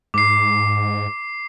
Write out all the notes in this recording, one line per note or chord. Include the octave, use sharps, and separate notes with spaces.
G#2 D6 C7